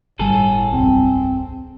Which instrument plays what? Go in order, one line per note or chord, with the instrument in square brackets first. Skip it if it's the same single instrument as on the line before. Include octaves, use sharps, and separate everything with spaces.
[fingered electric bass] G1 G3 [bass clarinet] A2 [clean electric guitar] G#4 A4
[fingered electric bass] D1 B1 G2 [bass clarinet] C4